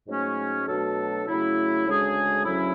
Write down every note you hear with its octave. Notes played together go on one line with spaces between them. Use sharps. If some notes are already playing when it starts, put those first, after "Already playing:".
G#2 F#3 A3 C#4
B2 F#3 A3 D4 A4
C#3 F#3 A3 E4
D2 C#3 G#3 D4 G#4
D2 C#3 F#3 C#4 E4